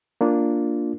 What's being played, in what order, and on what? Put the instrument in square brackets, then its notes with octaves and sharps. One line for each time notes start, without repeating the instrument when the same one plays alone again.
[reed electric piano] A#3 D4 F4